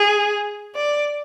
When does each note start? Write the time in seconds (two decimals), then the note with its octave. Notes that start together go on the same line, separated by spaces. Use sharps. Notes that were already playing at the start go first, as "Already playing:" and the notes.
Already playing: G#4
0.75 D5